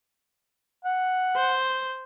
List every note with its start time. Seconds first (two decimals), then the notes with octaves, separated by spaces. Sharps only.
0.85 F#5
1.36 C5